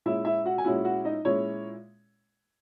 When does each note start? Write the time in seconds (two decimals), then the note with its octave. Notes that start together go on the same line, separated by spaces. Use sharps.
0.06 A#2 G#3 C#4 E4 E5
0.25 E4 E5
0.46 F#4 F#5
0.58 G#5
0.65 A#2 G#3 C#4 E4 F#4 F#5
0.84 F#4 F#5
1.05 D#4 D#5
1.25 A#2 G#3 C#4 E4 C#5